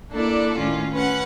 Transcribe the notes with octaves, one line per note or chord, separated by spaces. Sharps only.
A#3 D4 E4 A4 D5
A2 D#3 C#4 F4
C#4 B4 F#5